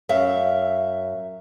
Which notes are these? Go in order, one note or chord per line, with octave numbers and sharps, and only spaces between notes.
F#2 E5 F5